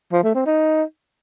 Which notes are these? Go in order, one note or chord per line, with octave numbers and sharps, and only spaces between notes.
F3
A3
C4
D#4